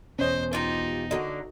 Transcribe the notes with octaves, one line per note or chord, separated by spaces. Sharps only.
E2 B2 C#4 C5 D#5
D#4 F4 G4
D3 A#3 F#4 A4 D#5